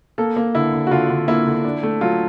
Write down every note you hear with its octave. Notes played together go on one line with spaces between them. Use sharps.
A#3 A4
A#3
D3 E4
D3
F#4
D3 F4
D3
A#3 E4
D3
D4
A3
F#3 F4